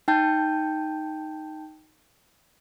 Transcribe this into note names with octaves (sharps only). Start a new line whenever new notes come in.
D#4 G5 A5 G6